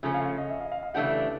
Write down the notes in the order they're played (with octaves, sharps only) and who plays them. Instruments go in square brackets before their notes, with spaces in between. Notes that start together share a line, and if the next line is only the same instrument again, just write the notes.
[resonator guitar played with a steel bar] C#3 F3 A3 C#4 [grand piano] E5
[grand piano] F5
F5
D#5
E5
F5
F5
F5
[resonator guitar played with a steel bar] C#3 E3 A3 D4 G4 [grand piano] F#5